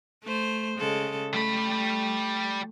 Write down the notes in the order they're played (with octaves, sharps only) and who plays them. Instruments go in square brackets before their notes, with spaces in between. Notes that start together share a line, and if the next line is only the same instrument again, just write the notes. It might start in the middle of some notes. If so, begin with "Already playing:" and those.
[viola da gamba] A3 C5
C#3 G#3 A4
[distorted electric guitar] G3 B5 [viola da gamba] A3